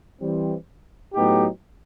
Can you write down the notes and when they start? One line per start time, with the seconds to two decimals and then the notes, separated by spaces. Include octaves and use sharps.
0.21 E3 G3 C4
1.14 A2 F#3 B3 D#4 G4